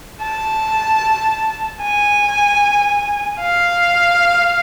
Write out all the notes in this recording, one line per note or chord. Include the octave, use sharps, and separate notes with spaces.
A5
G#5
F5